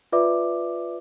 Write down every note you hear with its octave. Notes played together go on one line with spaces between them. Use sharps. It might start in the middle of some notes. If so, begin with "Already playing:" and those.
F4 B4 D5 E5 D6